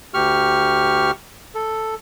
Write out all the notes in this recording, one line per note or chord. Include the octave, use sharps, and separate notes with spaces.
D2 G4 C#6 F6
A4